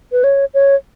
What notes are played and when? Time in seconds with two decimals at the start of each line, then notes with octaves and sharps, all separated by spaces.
0.12 B4
0.24 C#5
0.54 C#5